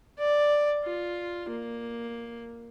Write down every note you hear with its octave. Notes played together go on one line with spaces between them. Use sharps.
D5
F4
A#3